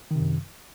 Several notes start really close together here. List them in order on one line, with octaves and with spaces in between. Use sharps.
D#3 C3 F#2